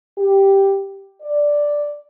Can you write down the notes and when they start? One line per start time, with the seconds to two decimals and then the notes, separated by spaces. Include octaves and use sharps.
0.18 G4
1.22 D5